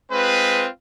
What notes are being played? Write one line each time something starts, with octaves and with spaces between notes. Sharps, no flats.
G#3 C4 F4 B4